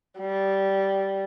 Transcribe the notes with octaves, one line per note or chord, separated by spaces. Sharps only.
G3